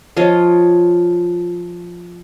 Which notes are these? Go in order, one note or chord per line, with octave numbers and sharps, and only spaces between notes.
F3 F4 C#5 D#5